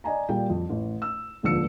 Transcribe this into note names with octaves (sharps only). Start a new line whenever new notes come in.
D5 D#5 G#5 A#5
A#2 G3 G5
F2
A1
E6
D#1 C#2 D3 F3 E6 C#7